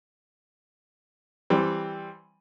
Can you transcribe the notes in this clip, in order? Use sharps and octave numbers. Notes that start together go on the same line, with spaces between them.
E3 G3 C4